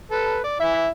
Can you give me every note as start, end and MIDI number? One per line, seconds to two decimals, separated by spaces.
0.11 0.40 69
0.11 0.40 71
0.44 0.55 74
0.60 0.88 52
0.60 0.88 64
0.60 0.88 76